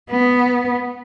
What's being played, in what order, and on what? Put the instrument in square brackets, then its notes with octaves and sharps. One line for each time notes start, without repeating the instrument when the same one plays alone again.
[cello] B3